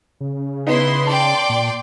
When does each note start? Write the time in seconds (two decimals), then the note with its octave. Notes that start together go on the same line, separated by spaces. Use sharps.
0.20 C#3
0.67 B3 D#4 E4 C6
1.07 D5 G5 A5 C6
1.49 A#2